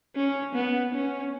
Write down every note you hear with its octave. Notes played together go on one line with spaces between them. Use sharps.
C#4
B3
C#4